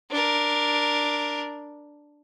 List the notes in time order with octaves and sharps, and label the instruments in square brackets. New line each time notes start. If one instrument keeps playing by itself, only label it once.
[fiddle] D4 A#4